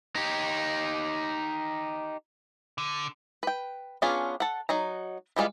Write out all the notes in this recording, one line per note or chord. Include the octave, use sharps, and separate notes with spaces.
D#4 G4
D3
B4 G5
B3 C#4 D4 F4 G#4
A4 F#5
F#3 D#4 A#5
E3 G3 G#3 F4